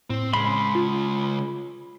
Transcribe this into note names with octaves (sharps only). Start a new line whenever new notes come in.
A2 C4
C#3 G#3 B5 C6
F4